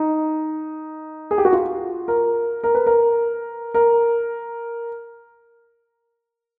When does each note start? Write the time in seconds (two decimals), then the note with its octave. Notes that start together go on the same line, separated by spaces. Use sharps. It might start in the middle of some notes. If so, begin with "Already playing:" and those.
Already playing: D#4
1.31 G#4
1.38 G4
1.45 F#4
1.53 F4
2.08 A#4
2.64 A#4
2.75 B4
2.86 A#4
3.74 A#4